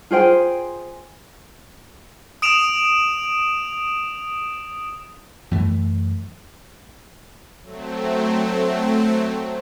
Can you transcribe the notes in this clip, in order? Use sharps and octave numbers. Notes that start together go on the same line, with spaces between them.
F4 G#4 C5 G5
D#6 D7 E7 F7
F#2 E3 A3
F#3 A3 C4